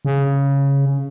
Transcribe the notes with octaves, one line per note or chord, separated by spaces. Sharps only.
C#3